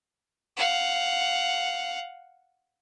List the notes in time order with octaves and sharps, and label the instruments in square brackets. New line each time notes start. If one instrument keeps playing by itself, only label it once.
[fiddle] F5 F#5